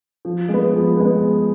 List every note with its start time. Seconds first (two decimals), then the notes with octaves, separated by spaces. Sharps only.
0.25 F3
0.49 G#3
0.54 B3
0.73 F3
0.97 G#3 B3